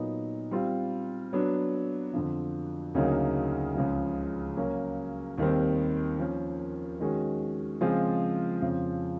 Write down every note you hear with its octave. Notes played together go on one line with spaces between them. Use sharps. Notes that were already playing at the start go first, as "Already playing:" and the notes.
Already playing: A#2 F#3 B3 D#4
G3 C4 F4
F#3 B3 D4
F2 D3 F3
D2 C#3 F#3 A#3 D#4
C#2 C#3 F3
F#3 A#3 C#4 F#4
D#2 D#3 G3 C4
F3 A#3 C#4
D#3 G#3 C#4 F#4
C#3 F3 G#3 C4 F4
F2 C#3 F3